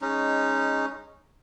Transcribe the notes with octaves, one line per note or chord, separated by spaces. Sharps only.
G#3 C#4 D#4